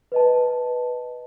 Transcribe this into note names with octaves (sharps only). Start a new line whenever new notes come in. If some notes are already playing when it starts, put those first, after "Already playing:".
B4 D#5 A5